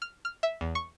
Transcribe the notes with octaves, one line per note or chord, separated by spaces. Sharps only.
F6
F6
E5
E2
C#6